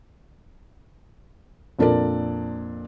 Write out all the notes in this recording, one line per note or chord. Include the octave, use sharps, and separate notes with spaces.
F2 A#2 D4 A4 A#4 D5